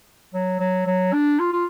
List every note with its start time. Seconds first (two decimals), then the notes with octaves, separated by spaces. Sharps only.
0.34 F#3
0.60 F#3
0.86 F#3
1.13 D4
1.39 F4
1.53 F4